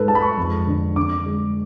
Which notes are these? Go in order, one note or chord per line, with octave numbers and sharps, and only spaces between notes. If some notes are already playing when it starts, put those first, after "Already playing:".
Already playing: G#2 A4 B4
G#3 A5
B5
C#6
F2
D3
D3 D6
G#3